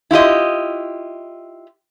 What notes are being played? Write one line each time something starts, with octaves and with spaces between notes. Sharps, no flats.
E4 F4 G4 D#5